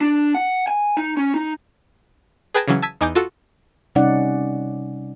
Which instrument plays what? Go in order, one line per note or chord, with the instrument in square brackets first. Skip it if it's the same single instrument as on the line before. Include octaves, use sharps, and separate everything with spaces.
[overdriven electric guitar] D4
F#5
G#5
D#4
C#4
D#4
[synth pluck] G#4 B4 G5 A5 G#6 A#6
C#3 E3 F#3 C#4
A5 E6 G#6 B6 D#7
E2 D#4 G#5 D6 D#6 G6
F4 F#4 A4
[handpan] C3 G3 C#4 D#4 D5 F#5